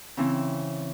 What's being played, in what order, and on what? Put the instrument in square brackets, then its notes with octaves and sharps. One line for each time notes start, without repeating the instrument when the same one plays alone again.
[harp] C#3 E3 C4